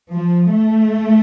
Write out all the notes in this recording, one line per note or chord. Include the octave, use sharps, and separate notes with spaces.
F3
A3